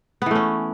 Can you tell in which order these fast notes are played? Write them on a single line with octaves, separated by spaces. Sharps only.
B3 E3 A3 C#4